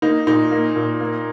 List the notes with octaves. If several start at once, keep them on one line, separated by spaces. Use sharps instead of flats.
A#3 D#4
A#2 D#4
A#3
A#2
A#3